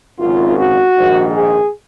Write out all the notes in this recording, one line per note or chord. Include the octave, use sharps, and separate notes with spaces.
G#1 F#2 C#3 F4
F#4
A#1 G#2 D#3
G#4